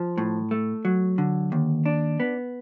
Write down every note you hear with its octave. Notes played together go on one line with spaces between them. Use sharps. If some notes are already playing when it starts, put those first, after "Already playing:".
Already playing: F3
A2
A3
F#3
D3
D#2
D4
B3